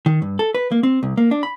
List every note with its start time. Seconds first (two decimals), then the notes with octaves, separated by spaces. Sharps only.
0.06 D#3
0.22 G2
0.39 A4
0.54 B4
0.72 A#3
0.83 C4
1.03 C2
1.17 A#3
1.31 D4
1.43 B5